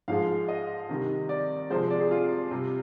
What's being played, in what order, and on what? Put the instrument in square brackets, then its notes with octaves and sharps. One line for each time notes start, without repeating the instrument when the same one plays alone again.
[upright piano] G#2 F3 G#3 F5
D#5
C3 D#3 G3
D5
C3 F3 G#3 C5
D5
G#4
F4
C3 G3